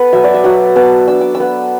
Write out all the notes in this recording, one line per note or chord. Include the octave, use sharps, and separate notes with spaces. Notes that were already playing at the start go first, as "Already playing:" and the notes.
Already playing: B3 A4 B4
F#3 E5
D5
E5
F#3 F#5
B3 A5
D4 E6
D6
E6
B3